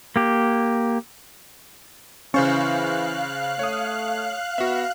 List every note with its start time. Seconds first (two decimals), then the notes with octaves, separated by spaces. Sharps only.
0.16 A#3 G4
2.34 C#3 E3 C#4 C5 F5 C#6 F#6
3.59 A3 C#5 D#6
4.58 B3 F#4 E5